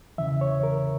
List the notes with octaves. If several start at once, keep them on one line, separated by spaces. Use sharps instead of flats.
E2 C#3 E3 E5
C#5
A#4